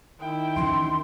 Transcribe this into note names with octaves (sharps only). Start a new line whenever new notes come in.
D#3 E4 G5
D2 E3 C#4 C6